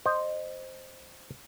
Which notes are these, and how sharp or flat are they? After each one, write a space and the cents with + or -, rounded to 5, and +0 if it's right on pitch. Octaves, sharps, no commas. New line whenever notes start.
C5 +0 D#5 -20